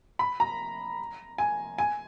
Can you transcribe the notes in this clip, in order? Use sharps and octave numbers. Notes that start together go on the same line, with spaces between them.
B5
A#5
G#5
G#5